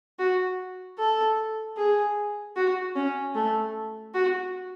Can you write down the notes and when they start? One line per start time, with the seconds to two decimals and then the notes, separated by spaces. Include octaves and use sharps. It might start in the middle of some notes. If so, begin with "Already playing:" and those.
0.19 F#4
0.99 A4
1.77 G#4
2.56 F#4
2.96 C#4
3.35 A3
4.14 F#4